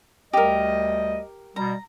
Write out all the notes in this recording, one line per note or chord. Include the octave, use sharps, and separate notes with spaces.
D2 G3 G4 A#4 D#5
B2 G3 A#5